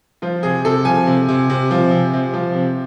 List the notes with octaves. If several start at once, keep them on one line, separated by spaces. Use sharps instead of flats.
F3 F4
C3 G#4
C3 A4
F3 G#5
C3
C3
C3
F3
C3
C3
F3
C3